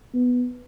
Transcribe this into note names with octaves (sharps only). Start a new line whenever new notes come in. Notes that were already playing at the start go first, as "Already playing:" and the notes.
B3